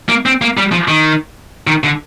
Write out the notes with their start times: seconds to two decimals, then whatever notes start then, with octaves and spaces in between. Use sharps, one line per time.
0.09 A#3
0.26 C4
0.42 A#3
0.57 G3
0.72 F3
0.88 D#3
1.67 D#3
1.84 D3